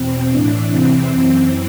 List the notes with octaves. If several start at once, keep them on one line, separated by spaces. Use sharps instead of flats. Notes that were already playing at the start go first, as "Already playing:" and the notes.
Already playing: E2 B2 C4
A2 E3 D4
E2 C3 E3 C4
F#2 E3 C4